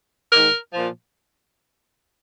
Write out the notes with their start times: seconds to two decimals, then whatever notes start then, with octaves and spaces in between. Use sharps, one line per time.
0.33 G#2 D#3 A#4
0.74 A#2 F3